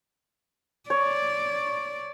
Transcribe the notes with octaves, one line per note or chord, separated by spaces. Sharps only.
C#5 D5